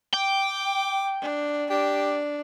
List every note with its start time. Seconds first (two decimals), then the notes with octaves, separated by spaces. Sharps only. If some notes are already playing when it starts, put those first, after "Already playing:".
0.13 G5 D6
1.22 D4
1.70 D4 G4